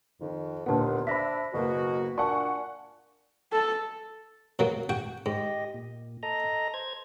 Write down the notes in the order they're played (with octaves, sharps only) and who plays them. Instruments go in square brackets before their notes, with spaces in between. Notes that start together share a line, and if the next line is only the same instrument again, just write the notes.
[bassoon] F2 [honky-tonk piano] D#3
[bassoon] D#2 [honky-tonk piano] A#2 D3 B3 [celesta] F#5 A5
[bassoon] D4 [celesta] C5 A#6 B6 [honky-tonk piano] E5 B5
[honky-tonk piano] F#1 A#3 [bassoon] B2 [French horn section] F#4
[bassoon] A#2 [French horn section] D4 [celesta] D5 A5 [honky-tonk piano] F#5 G#5 C#6
[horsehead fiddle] A4
[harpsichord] B2 F#3 A#3
F#4 G5
[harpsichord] G#2 [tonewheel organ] G4 D#5
[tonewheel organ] A#2
A4 D#5 A#5
C5 G#6